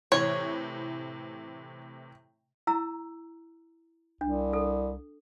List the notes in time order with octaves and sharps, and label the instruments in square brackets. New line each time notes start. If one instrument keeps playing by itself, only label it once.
[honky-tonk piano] A2 C3 E3 [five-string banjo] C#5
[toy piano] E4 A#5 E6
[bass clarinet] C2 [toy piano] D4
[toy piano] A4